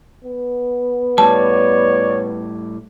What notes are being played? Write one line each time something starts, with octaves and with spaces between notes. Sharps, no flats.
B3
A2 G3 C#5 D5 A5